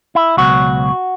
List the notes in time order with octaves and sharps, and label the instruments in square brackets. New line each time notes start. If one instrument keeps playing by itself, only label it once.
[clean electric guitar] E4
C#2 B2 F#3 F#4